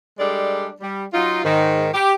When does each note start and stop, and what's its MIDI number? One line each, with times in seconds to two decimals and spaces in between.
0.19 0.70 55
0.19 0.70 56
0.19 0.70 62
0.19 0.70 69
0.19 0.70 74
0.81 1.04 55
1.13 1.44 54
1.13 1.44 63
1.13 1.44 65
1.45 1.88 44
1.45 1.88 51
1.94 2.14 67